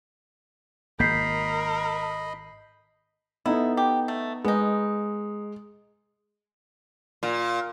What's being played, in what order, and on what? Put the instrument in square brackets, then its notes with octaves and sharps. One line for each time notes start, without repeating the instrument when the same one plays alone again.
[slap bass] G#1 A#3 [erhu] A#4 [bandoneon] D#5 B5 [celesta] G6 B6 C7
[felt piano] B3 D#4 A4 [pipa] E4
[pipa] G4
A3
[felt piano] G#3 [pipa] B3 D#4
[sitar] A#2